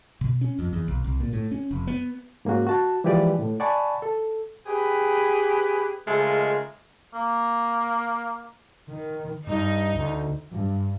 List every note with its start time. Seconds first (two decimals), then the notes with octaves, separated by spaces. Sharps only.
0.21 B2
0.41 C#4
0.59 F2
0.73 E2
0.88 B1
1.04 C2
1.20 A#2
1.33 A2
1.52 C#4
1.71 F1
1.87 B3
2.45 G#2 A#3 C#4 F#4
2.67 F#4 A5
3.04 E3 F3 G#3 G4 B4 D5
3.39 A2
3.60 D5 F#5 G#5 A5 B5 C#6
4.02 A4
4.66 G4 G#4 B4
6.07 C#3 G#3 A3 D#4 F4 A#4
7.14 A#3
8.89 D#3
9.47 G2 D#4
9.94 D2
10.51 G2